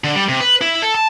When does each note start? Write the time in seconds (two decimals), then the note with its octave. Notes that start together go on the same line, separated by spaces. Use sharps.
0.04 D3
0.15 G3
0.29 C3
0.40 B4
0.61 E4
0.82 A4
0.94 A5